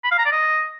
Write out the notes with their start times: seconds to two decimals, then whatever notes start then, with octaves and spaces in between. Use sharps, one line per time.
0.04 B5
0.11 F5
0.18 A#5
0.25 D5
0.32 D#5